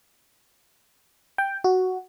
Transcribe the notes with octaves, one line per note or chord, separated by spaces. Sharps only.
G5
F#4